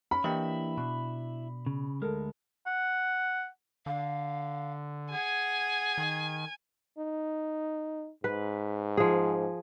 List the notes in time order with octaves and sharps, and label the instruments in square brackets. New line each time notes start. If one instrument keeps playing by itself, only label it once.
[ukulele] C#4 [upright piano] B5
[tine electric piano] E3 A#3 D4 [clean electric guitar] E4 [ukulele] G4 C#5 D#5
[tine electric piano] B2 [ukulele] D4
[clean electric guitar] C#3
[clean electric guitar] D2 G#3 [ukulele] A4 A#4
[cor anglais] F#5
[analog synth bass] D3 [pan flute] F5
[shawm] G#4 [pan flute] F#5 [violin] G#5
[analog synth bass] D#3
[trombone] D#4
[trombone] G#2 [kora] B4
[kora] F3 G#4